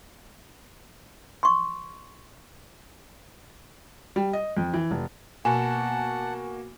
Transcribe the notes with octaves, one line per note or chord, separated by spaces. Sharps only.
C6 C#6
G3
D#5
F2
E3
F1
B2 A#3 F#4 F#5 G#5 A5